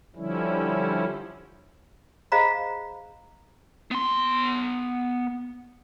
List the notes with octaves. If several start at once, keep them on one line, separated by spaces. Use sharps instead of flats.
D3 F3 G3 C#4 E4
G#4 C5 D#5 F5 A#5 B5
B3 C6